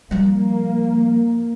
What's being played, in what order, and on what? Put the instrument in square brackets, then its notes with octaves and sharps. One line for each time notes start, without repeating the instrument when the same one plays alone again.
[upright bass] F3 G3 [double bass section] A#3